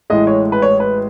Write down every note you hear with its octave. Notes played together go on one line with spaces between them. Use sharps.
A1 A2 G#3 D#5
C#5
B4
C#5
B4